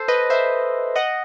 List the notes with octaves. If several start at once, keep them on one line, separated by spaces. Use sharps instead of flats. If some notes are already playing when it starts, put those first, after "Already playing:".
Already playing: A4 C5
B4 D#5
C5 E5
D#5 F#5